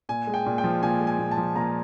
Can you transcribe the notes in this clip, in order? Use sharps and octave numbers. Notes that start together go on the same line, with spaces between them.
A#2 G#5
G#3
G5
A#2
G5
F3
A#2 G#5
G#3
G#5
A#2
A5
F3
A#2 A#5